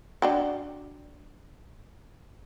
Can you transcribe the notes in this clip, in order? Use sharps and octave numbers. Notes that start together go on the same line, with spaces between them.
D4 F#4 G5